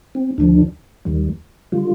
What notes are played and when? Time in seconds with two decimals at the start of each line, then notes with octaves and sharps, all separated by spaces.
0.15 C4
0.38 D2 D3 F3 D4
1.05 D#2 D#3 G3
1.72 D3 G3 F4